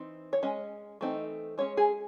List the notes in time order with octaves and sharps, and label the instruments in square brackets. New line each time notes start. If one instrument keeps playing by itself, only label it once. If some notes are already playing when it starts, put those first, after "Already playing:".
Already playing: [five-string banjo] E3 C4 D#4
C#5
G#3 C#4 D#5
E3 A3 C4 D#4
G#3 C#4 C#5
G#4